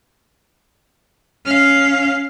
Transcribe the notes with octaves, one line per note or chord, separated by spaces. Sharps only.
C#4 F5